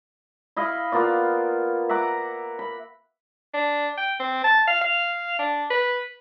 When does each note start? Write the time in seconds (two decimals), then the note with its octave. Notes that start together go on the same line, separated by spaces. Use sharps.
0.56 E4 D#5 F5 B5
0.92 A#3 B3 F4 D5
1.89 E5 F#5 A#5 D6
2.59 B5
3.54 D4
3.98 G5
4.19 C4
4.44 A5
4.67 F5
4.81 F5
5.39 D4
5.70 B4